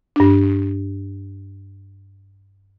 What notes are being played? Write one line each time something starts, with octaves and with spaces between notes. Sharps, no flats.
G2 D4